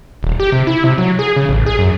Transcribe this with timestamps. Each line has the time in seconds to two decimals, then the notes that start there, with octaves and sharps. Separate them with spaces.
0.23 D#1
0.40 G4
0.52 C3
0.67 E4
0.84 C3
0.98 F#3
1.19 G#4
1.36 C#3
1.49 A1
1.66 G#4
1.79 F#2